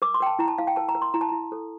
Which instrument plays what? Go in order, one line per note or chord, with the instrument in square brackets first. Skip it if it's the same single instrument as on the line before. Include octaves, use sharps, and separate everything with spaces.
[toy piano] A#4 D6
C6
A#4 G5
A5
E4 A#5
A5
E4 F5
G5
A#4 A5
A#5
A#4
C6
E4 A#5
A5
E4 A#5
A4